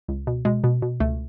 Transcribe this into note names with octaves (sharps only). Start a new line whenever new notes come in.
C#2
B2
B2 G#3
B2
B2
C#2 A3